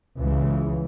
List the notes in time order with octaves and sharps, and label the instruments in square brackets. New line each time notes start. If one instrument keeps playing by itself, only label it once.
[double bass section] C#2 C#3 E3